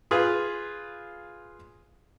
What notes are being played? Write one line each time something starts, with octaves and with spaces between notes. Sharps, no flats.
F4 G#4 B4 F5